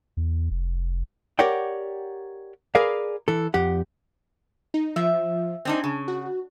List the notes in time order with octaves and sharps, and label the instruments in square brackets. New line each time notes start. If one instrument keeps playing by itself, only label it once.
[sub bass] E2
F1
[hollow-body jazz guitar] G4 A#4 C#5 D5 F#5 G5
G#4 A#4 B4 D5 F5
E3 A4
F2 G4 F#5
[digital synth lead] D#4
[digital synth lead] F3 [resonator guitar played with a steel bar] E5
[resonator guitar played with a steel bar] C4 D4 D#4 [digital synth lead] G#5
[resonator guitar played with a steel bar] C#3
[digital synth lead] F#4